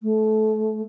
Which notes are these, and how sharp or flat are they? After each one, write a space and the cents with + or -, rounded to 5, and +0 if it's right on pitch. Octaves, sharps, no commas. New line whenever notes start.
A3 -25